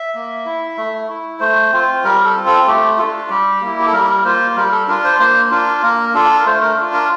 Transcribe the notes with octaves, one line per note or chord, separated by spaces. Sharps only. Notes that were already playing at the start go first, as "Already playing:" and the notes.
Already playing: E5
A#3
E4
A3
E4
A3 C5
C4 F4
G3 A#4
A4
C4 F4
A4
A3 G4
D4 F4 A4
G3 G4
A#3 E4
G4
A4
G3 A#4
A#3 F4 C5
G3 A#4
A4
D4 F4 A#4
C5
A#3 C5
D4 F4 A#4
A#3 A#4
D4 F4 A4
A#4
A3 C5
A#4
D4 F4
A#4